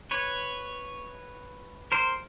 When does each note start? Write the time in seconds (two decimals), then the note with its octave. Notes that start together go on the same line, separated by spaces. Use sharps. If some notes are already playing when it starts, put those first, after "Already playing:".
0.11 B4 C#5
1.92 A#4 C5